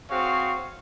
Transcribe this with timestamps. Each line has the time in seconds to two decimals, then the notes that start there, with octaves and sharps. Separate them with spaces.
0.10 C4 F#4 G#4 C#5 F5